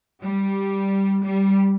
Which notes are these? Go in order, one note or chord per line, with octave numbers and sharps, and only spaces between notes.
G3
G3